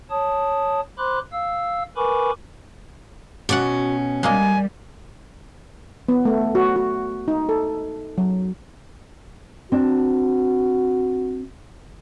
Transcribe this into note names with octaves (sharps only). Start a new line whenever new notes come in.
C#5 A5 D#6
C5 B5 C6 D6 F#6
F5 E6
A#4 B4 G#5 B5 C#6 D6
B2 C#4 F#4 D5 F#5
G3 G#3 A#3 D#5 G#5
B3
A3
F#4
F#4
D#4
A4
F#3
C4 D4 F#4